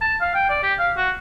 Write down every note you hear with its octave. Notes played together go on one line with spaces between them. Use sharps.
A5
F5
G5
D5
G4
F5
F#4